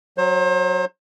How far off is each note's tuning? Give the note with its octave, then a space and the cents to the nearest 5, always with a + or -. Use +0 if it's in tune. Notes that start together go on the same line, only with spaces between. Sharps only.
F#3 +0 C5 +35